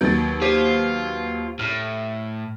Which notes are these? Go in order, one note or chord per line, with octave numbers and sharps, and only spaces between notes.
D#2 F#3 B3 G6 A6
F4 G4 C5
A2 F6